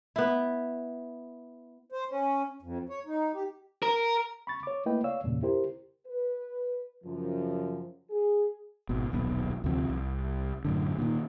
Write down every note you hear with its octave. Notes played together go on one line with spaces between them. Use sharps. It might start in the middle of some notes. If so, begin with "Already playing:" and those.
B3 E4
C5
C#4
F2
C#5
D#4
G4
A#4
B5 C#6 A6
C#5 D6
A3 A#3 E4 B4 D#5 G5
C#5 D5 F5 E6
E2 G2 A#2 C#3
E4 G4 A#4 C5
B4
F#2 C#3 F3
G#4
G#1 B2
D#1 B1 C#3 B3
D2 C3 F3
C2
F#2 A2 D3
A#2 D#3